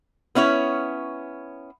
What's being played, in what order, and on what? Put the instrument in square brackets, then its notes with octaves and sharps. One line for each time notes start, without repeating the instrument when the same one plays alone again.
[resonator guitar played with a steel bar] B3 C#4 E4 C#5